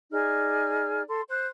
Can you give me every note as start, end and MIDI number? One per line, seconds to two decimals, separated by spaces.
0.12 1.02 63
0.12 1.02 68
0.12 1.02 74
0.12 1.02 89
1.08 1.21 69
1.08 1.21 84
1.29 1.46 72
1.29 1.46 90